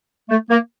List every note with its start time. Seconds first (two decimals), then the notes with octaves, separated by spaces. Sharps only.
0.30 A3
0.50 A#3